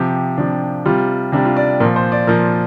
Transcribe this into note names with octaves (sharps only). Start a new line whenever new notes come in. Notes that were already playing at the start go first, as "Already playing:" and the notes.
Already playing: C3 F3 G4
C3 F3 D4
C3 G3 F4
C3 G3 D4
F4
D5
A#2 F3 A#4
C5
D5
A#2 F3 A#4